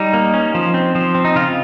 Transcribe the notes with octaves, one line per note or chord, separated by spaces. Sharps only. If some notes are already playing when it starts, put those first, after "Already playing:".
Already playing: G3 D#4
A#3
C#4
F3
C4
F3
C4
D#4
C#3 F4